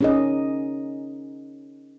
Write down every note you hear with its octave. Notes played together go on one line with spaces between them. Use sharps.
C#4 D#4 G#4 A#4 D#5